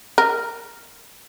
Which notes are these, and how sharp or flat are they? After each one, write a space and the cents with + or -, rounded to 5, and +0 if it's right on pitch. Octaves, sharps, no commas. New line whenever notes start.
A#4 -10